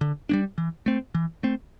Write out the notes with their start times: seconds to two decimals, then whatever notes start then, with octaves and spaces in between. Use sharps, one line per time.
0.01 D3
0.29 G3 A#3 D4
0.58 E3
0.86 A3 C4
1.15 E3
1.43 A3 C4